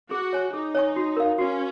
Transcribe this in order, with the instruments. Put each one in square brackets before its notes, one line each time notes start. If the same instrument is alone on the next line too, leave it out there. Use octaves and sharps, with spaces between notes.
[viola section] F#4 [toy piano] G#4
[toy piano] C#5 G#5 C#6
[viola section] D#4 [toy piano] G#4
[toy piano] C#5 G#5 C#6
F#4
A#4 F5
[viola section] C#4 [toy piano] F#4